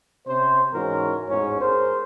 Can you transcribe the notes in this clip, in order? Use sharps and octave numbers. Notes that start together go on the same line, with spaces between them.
C3 C#4 C5
G#2 E3 C#4 F#4 A#4
A1 E2 G#2 C#4
G#4 A#4 C5